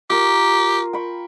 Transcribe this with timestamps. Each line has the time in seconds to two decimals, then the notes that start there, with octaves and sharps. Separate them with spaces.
0.10 F4 G4 A#4
0.93 G5 B5 C#6